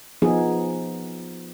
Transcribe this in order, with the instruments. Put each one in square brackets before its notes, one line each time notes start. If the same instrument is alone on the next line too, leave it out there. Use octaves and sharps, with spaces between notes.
[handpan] F3 B3 D#4 G#4